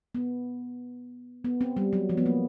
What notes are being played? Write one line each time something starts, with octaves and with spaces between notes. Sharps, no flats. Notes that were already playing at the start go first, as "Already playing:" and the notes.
B3
B3
C4
G3
F#3
F3
B3
A#3